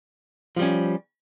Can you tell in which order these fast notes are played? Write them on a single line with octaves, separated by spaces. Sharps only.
F3 G3 C#4